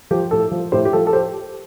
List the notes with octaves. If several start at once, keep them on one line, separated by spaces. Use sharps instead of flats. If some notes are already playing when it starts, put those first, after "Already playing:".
F3 G4
A2 A4
F3
A2 G4 C5
G4
F3 A4
A4
G4 C5